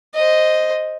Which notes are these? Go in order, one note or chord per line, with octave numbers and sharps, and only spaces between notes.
C5 D#5